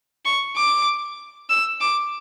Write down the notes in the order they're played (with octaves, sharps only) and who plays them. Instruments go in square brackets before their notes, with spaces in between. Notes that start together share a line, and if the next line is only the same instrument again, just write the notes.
[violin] C#6
D6
E6
D6